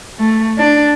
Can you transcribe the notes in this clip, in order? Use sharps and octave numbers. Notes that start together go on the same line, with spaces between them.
A3
D4